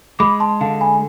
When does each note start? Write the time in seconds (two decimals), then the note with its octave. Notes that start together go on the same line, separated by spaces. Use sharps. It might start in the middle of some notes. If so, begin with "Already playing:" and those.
0.19 G#3 B5 D6
0.40 A5 C6
0.60 D3 F5 A5
0.81 G#5 B5